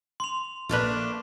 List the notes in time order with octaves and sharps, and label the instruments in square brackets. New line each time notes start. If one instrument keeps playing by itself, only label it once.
[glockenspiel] C6 F7
[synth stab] A#1 B4 [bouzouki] A3 A#3 D4